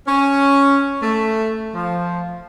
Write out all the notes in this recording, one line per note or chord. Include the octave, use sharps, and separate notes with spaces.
C#4
A3
F3